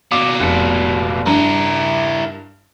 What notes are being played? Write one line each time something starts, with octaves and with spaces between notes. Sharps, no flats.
B2 A#3 D6
F1 C#7
G2 E4 A#4